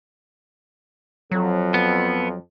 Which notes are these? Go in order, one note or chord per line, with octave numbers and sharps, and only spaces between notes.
F2 F#3
B3